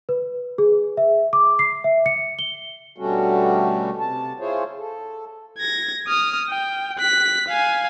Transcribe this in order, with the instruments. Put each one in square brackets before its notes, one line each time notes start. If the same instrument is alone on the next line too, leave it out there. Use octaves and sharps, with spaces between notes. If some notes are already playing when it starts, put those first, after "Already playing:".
[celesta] B4
G#4
E5
D6
C7
E5
C#7
G7
[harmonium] B2 D3 G3 A3 C#4 F#4
C3 A5
E4 F4 G#4 C5 C#5
A4
[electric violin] G#6 A#6
D#6 F6
G5
F#6 B6
F5 G#5